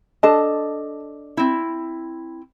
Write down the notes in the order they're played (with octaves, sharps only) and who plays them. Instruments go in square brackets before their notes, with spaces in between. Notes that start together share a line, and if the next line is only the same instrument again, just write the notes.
[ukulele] D4 A4 D#5 [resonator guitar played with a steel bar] A5
[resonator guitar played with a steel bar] C4 E4